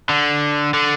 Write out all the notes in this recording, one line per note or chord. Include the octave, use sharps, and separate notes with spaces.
D3
D3